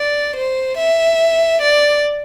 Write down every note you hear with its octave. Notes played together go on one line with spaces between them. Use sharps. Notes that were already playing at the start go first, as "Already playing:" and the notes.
Already playing: D5
C5
E5
D5